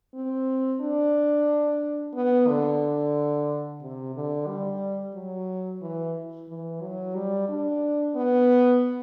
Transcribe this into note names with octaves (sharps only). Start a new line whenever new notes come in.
C4
D4
B3
D3
C3
D3
G3
F#3
E3
E3
F#3
G3
D4
B3